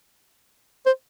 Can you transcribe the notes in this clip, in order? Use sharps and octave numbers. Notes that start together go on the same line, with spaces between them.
C5